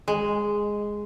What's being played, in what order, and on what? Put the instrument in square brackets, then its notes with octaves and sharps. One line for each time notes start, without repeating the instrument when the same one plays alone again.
[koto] G#3